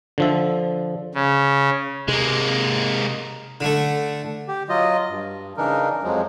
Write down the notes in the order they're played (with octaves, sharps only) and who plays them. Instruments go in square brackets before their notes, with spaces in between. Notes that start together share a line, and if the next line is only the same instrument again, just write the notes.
[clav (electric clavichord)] D3 F3 E5
[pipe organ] C#3
[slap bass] C3 [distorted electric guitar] G#3 A#3
[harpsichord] D3 A3
[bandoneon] G4
F#3 F4 D#5
G2
C#3 E3 D4 D#4 A#4
F2 F3 F#3 G#3